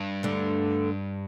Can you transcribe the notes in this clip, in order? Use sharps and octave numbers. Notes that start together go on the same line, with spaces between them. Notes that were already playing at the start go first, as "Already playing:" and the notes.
Already playing: G2
D2 D3